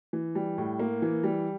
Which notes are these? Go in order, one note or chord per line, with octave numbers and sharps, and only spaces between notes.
E3
G3
A2
A#3
E3
G3